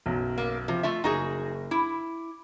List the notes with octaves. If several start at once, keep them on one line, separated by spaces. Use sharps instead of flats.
B1 F#2
A#3
C3 F3
A3 F4 E5 C6
F#1 D#4 F#4 G#4
E4 D6